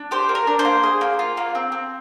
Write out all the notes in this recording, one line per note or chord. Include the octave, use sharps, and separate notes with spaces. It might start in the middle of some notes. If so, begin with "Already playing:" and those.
Already playing: D4
G4 C5
A#3
A#4
D4
C5
A#3
G#4
A#3
F4
A#3
C4
C4